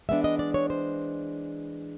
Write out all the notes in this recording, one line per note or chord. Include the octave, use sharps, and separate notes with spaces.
E3 G#3 B3 D4 E5
D#5
D5
C#5
C5